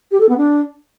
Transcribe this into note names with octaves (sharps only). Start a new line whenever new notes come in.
G4
A4
B3
D4